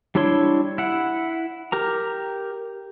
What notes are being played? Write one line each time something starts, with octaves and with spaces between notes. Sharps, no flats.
G3 D4 E4 C#5 C6
E4 F#5
G4 A#4 A#5